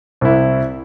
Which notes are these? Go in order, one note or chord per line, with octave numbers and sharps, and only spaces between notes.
C2 E4